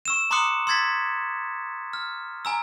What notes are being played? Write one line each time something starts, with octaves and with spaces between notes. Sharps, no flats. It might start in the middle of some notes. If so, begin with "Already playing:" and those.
C#6 E6 E7
A#5 C6 D6 D#6 F#6 C#7
C6 E6 G#6 A6 B6
F6
G#5 A#5 E6